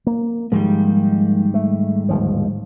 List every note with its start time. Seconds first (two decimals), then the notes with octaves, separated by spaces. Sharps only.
0.07 A#3
0.52 G#2 D#3 F3 G3 G#3 A#3
1.54 A3
2.09 D1 D#2 F3